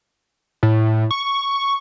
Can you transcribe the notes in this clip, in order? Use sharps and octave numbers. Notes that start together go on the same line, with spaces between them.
A2
C#6